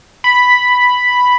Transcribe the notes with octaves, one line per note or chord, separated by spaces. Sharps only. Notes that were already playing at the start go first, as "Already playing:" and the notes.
B5